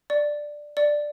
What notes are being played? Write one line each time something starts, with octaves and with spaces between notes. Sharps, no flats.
D5
D5